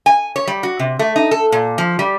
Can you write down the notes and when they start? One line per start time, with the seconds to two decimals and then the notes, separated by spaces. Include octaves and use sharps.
0.06 G#5
0.36 C#5
0.47 G3
0.63 F#4
0.79 C3
0.99 A3
1.16 D#4
1.31 A4
1.52 A#2
1.78 F3
1.99 G3